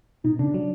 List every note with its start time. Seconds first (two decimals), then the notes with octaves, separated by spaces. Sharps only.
0.24 B2 D#4
0.39 C#3 D4
0.54 F#3